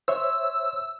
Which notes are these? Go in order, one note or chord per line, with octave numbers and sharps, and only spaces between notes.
C5 C#5 E5 E6